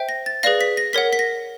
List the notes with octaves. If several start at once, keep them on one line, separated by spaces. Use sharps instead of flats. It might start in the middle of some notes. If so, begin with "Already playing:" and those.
Already playing: C5 E5 G5
A#6
A6
G#4 B4 D5 F5 A#6
B6
A#6
A#4 C#5 F#5 B6
B6
A#6